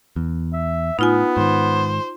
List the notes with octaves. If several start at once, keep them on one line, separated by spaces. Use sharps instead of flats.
E2
E5
A2 B3 D#4 F4 G#5
G#2 D#3 C5